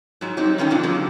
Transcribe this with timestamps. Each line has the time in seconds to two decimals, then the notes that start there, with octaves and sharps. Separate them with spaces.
0.21 G#2 F#3
0.37 F#3 G3 C4 D#4
0.58 G2 D3 D#3 C#4 A4 G5
0.70 G#2 B2 F#3 A#3 D4 F4
0.83 D3 F3 F#3 A#3 C4 G4